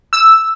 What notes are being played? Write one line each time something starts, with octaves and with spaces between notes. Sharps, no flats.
E6